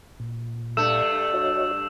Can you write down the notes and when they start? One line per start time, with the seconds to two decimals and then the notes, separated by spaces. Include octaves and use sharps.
0.20 A#2
0.77 G2 A3 E6 E7
1.34 F#4 C#5 D#5